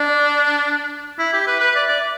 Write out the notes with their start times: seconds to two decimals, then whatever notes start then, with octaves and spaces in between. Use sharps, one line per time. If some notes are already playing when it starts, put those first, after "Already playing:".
Already playing: D4 D5
1.18 E4 E5
1.33 G4
1.47 B4 E5
1.60 B4
1.75 D5
1.89 D5